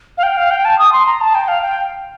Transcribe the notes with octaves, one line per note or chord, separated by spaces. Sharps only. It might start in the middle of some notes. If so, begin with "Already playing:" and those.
F5
G5
F5
G5
A5
D#6
C6
A#5
A5
G5
F5
G5